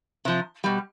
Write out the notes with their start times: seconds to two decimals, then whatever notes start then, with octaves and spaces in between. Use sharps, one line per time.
0.25 C3 F3
0.64 B2 G3